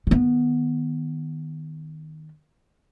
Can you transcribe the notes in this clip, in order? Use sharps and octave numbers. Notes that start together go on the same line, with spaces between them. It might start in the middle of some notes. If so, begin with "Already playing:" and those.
D#3 B3